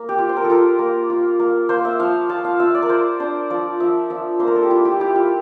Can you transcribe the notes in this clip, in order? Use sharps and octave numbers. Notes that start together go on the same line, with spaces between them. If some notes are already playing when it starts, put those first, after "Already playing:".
Already playing: A#3
G4
F4
C5
A#4
A4
F4 A#4
A#3
F4
A#3
A#3 C5
E5
F3 F5
F4 A5
F5
F4 E5
D5
A#4
F4 C5
D4 C5
F3 D5
F3 E5
F3 E5
A#3 C5
A#4
A4
G4
E4 F4
G4
E4 G4
F4